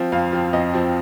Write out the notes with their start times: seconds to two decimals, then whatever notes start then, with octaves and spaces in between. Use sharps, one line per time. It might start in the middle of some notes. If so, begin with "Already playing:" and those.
Already playing: F3 C4
0.12 F2 F5
0.32 F3 C4
0.53 F2 D#5
0.74 F3 C4